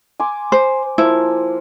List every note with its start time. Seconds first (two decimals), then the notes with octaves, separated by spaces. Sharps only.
0.20 G#5 C6 D6
0.52 C5
0.98 F3 A#3 E4